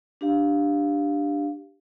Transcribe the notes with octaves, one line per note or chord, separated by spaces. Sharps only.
D4 G4 F5